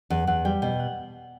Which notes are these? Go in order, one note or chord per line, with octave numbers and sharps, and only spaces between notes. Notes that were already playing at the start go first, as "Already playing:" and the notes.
E2 F#5
E2 F#5
G3 G5
B2 G5
F#5